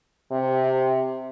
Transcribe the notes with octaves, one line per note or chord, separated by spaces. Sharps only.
C3